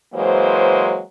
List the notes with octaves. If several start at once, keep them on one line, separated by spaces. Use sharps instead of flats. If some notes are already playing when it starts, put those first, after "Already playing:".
E3 F#3 G#3 A#3 C5